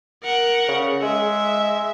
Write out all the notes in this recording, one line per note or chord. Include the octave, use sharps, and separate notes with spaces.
A#4 F#5
C#3
G#3 E5